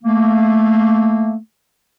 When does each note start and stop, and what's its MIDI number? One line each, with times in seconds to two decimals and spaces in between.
0.04 1.36 57
0.04 1.36 58